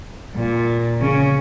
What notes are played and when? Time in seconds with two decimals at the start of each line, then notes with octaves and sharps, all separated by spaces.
0.36 A#2
1.01 C#3 C#4